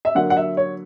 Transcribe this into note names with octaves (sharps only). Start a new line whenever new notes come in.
E5
D3 F#3 A#3 F#5
F#5
E5
C#5